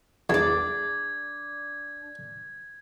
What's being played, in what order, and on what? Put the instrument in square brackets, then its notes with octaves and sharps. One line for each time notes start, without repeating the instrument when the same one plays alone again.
[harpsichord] E2 [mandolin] D4 D5 [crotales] G#6